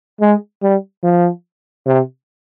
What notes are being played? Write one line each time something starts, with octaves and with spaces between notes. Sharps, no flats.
G#3
G3
F3
C3